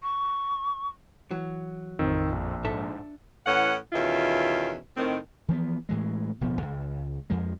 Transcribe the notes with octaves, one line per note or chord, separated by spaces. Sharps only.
C#6
E3 F#3
A1 F2 D#3 C4 E6
A#1
G#2 D4 A4 E5
A2 E3 C#4 F#5
E2 B2 D#3 C#4 F4 E5
A2 D#3 C4
E3 F3 A#3 B3
A2 E3 G#3
D1 B2 F3 B3
C#2
F2 F3 G#3